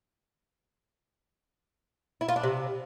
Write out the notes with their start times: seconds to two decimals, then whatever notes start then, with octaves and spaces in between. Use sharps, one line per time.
2.21 E4
2.28 F4
2.36 D4
2.43 C3